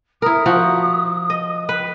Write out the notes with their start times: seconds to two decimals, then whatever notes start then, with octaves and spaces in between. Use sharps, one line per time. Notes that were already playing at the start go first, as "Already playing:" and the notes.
0.22 E4 A#4 D#6
0.46 F3 F#4
1.30 D#5
1.69 B4 G5